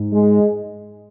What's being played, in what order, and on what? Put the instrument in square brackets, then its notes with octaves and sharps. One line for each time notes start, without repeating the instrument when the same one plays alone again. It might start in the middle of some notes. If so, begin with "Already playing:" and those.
Already playing: [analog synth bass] G#2
[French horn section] G#3